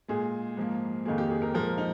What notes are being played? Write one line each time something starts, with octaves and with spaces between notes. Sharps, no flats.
A#2 G#3 G#4
G#2 F3 A#3
F2 D#3 A#3 G#4
G4
G#4
A#4
A#2 F3 G#3 A#4
D#4